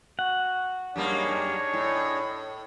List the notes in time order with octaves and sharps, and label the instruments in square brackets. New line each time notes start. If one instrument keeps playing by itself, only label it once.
[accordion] F#4 [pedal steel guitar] F#5
[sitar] F#2 G3 A#3 [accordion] D4 D#4 G#4 [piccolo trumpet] C#5
[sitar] A2